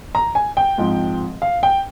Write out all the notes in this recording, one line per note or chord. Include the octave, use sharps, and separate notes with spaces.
A#5
G#5
G5
G#2 F3 C4
F5
G5